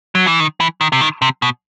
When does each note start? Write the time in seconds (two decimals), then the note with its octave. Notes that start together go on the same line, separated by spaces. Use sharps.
0.15 F#3
0.27 E3
0.40 D#3
0.60 E3
0.81 D#3
0.93 C3
1.01 D#3
1.22 C3
1.42 B2